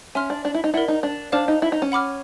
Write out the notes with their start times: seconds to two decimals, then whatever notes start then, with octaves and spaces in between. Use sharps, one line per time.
0.15 C#4 E5 G#5 C6 F6
0.30 D4
0.45 D4
0.54 E4
0.64 D#4
0.74 E4 A#4 D5 F#5
0.88 D#4
1.03 D4
1.32 D4 C5 F5 A5 D6 F6
1.48 D#4
1.62 E4
1.72 D#4
1.82 C#4
1.92 F#5 B5 D6 F6